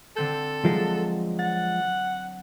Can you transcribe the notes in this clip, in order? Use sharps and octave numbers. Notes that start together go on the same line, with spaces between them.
D3 C4 A4 G6
F3 F#3 G#3
F#5 A6